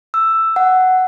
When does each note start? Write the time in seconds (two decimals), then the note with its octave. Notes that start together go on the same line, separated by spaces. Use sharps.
0.14 E6
0.56 F#5